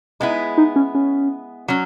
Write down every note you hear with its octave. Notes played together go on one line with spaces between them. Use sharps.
G#3 B3 D#4 E4
D#4
C#4
C#4
F#3 C#4